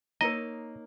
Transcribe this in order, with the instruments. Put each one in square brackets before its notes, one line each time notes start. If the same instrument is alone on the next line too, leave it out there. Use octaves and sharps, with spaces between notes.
[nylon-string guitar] A#3 D#4 C#5 [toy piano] A#4 A#5 [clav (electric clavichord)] D#5